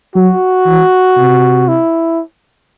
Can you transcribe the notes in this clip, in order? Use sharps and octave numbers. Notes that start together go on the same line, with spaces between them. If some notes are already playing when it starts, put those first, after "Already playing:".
F#3 F#4
E3
C3
E4